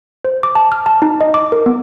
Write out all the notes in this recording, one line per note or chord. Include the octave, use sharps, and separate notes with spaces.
C5
D6
A5
F6
A5
D#4
D#5
D6
A#4
B3